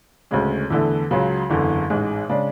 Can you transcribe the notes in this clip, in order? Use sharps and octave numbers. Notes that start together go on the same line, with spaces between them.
D2 C#3 G#3 C#4
E2 D3 A3 E4
C#2 C#3 F#3
F#1 E2 D3
A1 G#2 G#3
C#3 G#3 D4